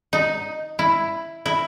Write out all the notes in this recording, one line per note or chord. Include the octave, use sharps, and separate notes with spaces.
D#4
E4
E4